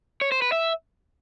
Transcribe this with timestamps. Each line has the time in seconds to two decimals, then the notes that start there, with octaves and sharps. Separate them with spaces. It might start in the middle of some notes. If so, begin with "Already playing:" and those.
0.21 C#5
0.32 C5
0.42 B4
0.52 E5